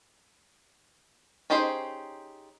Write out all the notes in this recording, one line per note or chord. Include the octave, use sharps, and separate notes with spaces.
C#4 D#4 G4 G#4 C5